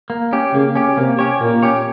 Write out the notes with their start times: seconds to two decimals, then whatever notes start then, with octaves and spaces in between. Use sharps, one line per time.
0.10 A#3
0.33 C#4 G4
0.54 C#3 A#3
0.75 C#4 G4
0.97 C3 A#3
1.19 C#4 G4 C#5
1.41 A#2 A#3
1.62 C#4 G4 C#5